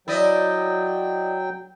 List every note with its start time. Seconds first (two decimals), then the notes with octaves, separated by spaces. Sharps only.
0.08 F#3 E4 D5 D#5 G5